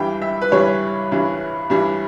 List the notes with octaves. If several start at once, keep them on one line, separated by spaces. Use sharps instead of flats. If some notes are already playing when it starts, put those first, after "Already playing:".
Already playing: G2 E3 G3 G5
E5
B4
G2 E3 G3 C#5
G2 E3 G3
G2 E3 G3